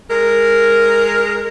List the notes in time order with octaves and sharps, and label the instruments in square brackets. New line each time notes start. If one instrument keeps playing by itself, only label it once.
[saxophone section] G#3 A#4